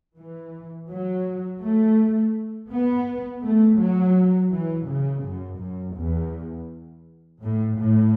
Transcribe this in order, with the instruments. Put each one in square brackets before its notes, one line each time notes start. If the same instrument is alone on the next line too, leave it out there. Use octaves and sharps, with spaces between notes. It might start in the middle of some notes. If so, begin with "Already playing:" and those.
[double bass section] E3
F#3
A3
B3
A3
F#3
E3
C#3
F#2
F#2
E2
A2
A2